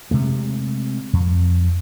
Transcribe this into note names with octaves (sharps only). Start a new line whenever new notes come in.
C3 G#3 A3
F2